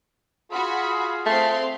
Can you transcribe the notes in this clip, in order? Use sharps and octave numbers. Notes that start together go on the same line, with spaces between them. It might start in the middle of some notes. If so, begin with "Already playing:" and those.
F4 F#4 G#4 B5
A3 C4 F5 C6